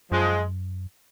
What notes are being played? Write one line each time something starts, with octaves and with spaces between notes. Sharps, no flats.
F#2 F3 G#3